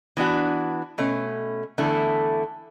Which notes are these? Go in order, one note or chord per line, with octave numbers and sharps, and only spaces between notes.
E3 B3 D4 F#4
B2 A3 C#4
E2 D3 A3 E4